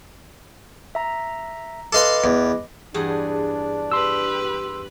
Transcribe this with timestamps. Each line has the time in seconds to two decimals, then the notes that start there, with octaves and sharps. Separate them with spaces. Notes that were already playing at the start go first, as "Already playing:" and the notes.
0.95 E5 A#5
1.93 A4 B4 D#5 F5 C6 D6
2.24 E2
2.94 E2 G2 D4 G#4
3.92 G4 B4 C6 E6